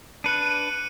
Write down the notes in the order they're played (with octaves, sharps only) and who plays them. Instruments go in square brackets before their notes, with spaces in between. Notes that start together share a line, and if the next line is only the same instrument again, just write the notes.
[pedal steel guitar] D4 B4 [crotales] F#6 C#7 D#7